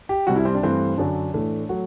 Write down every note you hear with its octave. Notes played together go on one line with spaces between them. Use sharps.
G4
C2 C3 G3 F#4
E4
C4
D4
G2 E3 A3 C4
F#2 D3 F#3 D4
A2 E3 A3 D4
F#3 A3 F#4